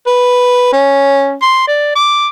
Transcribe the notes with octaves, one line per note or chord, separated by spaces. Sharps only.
B4
C#4
C6
D5
D6